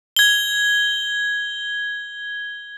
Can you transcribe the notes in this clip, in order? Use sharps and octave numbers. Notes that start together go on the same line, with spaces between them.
G#6 G7